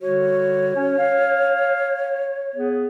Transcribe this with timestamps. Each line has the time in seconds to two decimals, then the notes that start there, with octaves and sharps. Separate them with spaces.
0.02 D3 G3 F#4 C#5
0.74 C#4
0.98 F5
2.54 B3 G#4